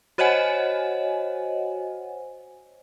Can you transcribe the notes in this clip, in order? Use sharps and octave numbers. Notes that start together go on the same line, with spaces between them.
F#4 C5 C#5 D#5 F#5 G#5